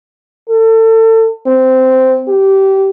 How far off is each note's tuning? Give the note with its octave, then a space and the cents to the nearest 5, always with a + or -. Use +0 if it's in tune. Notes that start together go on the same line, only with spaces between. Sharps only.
A4 +30
C4 -10
G4 -20